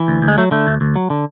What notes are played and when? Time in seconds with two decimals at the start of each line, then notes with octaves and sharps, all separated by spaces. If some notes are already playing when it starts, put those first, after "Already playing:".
Already playing: E3
0.08 D2
0.22 D2
0.28 G#3
0.38 F#3 A3
0.51 D3 A3
0.67 D2
0.81 D2
0.96 F#3
1.10 D3